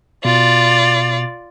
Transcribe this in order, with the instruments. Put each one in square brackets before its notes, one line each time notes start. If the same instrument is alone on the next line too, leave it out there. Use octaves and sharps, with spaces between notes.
[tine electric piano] B2 [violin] F4 D5